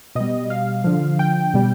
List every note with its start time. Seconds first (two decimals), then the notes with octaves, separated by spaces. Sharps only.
0.15 B2 G3 D#5
0.50 F5
0.84 D3 F3
1.19 G5
1.54 B2 G3